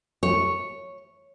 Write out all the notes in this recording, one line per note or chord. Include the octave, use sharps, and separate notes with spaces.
C#5